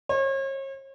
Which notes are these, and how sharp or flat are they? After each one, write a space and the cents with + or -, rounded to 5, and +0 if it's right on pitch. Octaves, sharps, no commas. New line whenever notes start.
C#5 -40